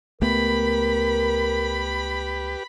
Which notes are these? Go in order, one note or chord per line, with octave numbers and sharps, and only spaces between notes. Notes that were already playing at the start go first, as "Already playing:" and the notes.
C#2 A3 B3 G4 A#4 B4 B5